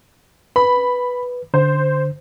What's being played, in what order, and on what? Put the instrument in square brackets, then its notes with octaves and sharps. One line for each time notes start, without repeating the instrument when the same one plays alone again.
[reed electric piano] B4 [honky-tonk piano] B5
[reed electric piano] D3 [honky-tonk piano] C5